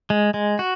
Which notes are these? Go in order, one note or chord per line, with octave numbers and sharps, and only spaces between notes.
G#3
G#3
F#4